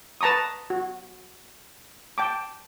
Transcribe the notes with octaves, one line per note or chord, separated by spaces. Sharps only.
B4 A5 A#5 C#6 D#6
F#4
G5 A5 D6